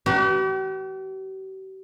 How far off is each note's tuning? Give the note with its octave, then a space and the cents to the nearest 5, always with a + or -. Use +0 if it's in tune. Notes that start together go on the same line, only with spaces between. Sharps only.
G4 -45 B4 +0